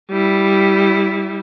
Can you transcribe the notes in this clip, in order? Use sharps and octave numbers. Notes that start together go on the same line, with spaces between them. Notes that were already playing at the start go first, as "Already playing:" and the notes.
G3 E4